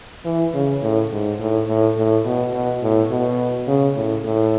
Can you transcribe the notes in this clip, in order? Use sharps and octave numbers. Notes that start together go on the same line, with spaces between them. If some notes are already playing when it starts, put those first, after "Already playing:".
E3
C#3
A2
G#2
A2
A2
A2
B2
B2
A2
B2
C#3
A2
A2